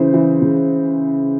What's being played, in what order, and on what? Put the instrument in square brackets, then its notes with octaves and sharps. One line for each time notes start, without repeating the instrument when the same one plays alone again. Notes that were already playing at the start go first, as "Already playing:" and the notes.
Already playing: [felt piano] C#3 E3 C5
E3
C#3